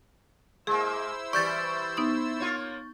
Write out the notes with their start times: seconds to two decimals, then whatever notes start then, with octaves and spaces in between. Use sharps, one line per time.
0.67 G#3 A#3 E4 G#4 C5 E6
1.33 E3 G3 D5 C#6 G6 A6
1.97 B3 D#4 D#6
2.40 A#3 F4 C#5